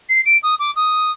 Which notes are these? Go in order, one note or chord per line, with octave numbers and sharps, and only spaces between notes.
C7
D7
D#6
D6
D#6